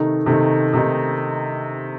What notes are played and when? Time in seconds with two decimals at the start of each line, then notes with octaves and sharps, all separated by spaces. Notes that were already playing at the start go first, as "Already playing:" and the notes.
Already playing: C3 D#3 A3 D#4
0.26 C3 D#3 A3 D#4
0.73 C3 D#3 A3 D#4